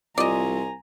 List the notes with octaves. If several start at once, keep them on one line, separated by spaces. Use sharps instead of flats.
C2 F4 D5 D#5 G#5 A#5